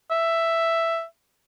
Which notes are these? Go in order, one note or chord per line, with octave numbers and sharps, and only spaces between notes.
E5